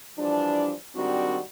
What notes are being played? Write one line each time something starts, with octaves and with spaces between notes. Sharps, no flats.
E3 F3 G3 D4
G#2 D#3 G3 C4 D4 F#4